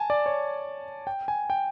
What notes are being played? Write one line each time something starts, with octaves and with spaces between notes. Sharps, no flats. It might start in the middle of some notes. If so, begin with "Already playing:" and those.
Already playing: G#5 A5
D5
C#5
G5
G#5
G5